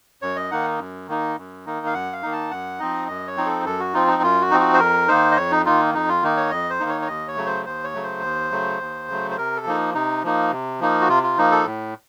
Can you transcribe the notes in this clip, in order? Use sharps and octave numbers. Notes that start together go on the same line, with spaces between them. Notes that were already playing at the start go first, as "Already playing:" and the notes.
F#2 C#5
D#5
D#3 A#3 D#4 F#5
F#2
D#3 A#3 D#4
F#2
D#3 A#3 D#4
F5
F#2 F#5
F5
D#3 A#3 D#4
A5
F#2 F#5
F3 C4 D#4 D#5
F#2 D#5
C#5
F3 C4 D#4
A4
F#2 A4
F#4
F3 C4 D#4 F4
D#4
F#2 F4
F#4
F3 C4 D#4
F#4
C5
F2 A#4
D#3 A#3 D#4 C5
D#5
F2 C#5
D#4
D#3 A#3 D#4 F4
F2 D#4
F4
D#3 A#3 D#4
C#5
F2 D#5
C5
D#3 A#3 D#4
C#5
C#5
D#2 D#5
C#5
C#3 F#3 A3
C5
D#2 C5
C#5
C#3 F#3 A3
C5
D#2
C#3 F#3 A3
D#2
C#3 F#3 A3
C5
C3 A#4
A4
F3 A#3 D#4
C3 D#4
F3 A#3 D#4
C3
F3 A#3 D#4
F#4
C3 F4
F4
F3 A#3 D#4
A4
A2